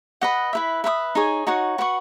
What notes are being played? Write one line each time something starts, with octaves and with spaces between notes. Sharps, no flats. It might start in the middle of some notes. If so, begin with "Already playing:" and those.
B4 D#5 F#5
E4 B4 E5
B4 E5 B5 D#6
D#4 G#4 C#5 G#5
D#4 F#4 C#5 F#5
F#4 B4 F#5 C#6